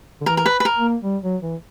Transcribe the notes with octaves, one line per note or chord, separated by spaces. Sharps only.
D3
E3 A#4
A#4
B4
B4
A#4
A#3
G3
F#3
E3